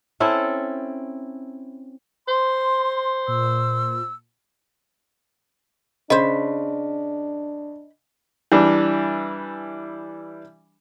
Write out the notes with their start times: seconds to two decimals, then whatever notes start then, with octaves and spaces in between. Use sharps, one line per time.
0.20 C4 C#4 E4 A4
2.28 C5 C6
3.28 A#2 E6
6.10 C#3 D4 C5 D#5 B5
8.52 E3 G3 D4